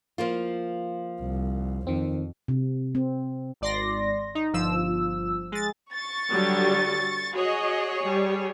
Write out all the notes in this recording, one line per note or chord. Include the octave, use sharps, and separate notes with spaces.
F3 A#3 F4
C2
F2 D#3 C4
C3
C4
G#1 D5 C6 A#6
D#4
G1 F3 E6
G#3 A6
C#6 A6
D3 F#3 G3
F#4 G#4 C#5 D#5
G3